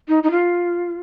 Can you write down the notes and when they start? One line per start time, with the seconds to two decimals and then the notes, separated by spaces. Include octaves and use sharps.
0.08 D#4
0.23 D#4
0.31 F4